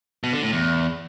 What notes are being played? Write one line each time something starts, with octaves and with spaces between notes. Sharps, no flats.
B2
D3
A2
E2